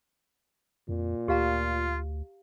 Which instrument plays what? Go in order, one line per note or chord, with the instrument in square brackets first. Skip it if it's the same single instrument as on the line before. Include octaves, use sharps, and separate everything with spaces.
[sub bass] F2 [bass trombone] A#2
[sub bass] D2 [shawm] F4 [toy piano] G4 F5 A#5